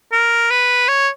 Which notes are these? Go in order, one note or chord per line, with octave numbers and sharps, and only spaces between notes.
A#4
B4
C#5